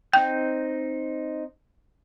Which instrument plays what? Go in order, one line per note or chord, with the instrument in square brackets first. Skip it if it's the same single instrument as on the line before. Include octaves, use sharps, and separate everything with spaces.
[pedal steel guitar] C4 D#4 G6 [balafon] G5